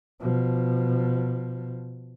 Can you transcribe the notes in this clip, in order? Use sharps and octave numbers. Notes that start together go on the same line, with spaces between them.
B2 F3